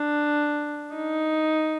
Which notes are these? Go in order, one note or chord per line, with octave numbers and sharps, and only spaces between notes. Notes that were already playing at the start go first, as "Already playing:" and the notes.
Already playing: D4
D#4